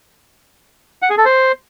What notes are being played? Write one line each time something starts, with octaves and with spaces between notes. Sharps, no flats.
F#5
G#4
A4
C5